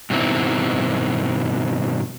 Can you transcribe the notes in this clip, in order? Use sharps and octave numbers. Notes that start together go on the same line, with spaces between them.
G2 B2 D#3 C4 E4